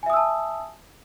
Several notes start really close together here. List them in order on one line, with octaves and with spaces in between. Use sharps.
G#5 E5 D#6 E6 A5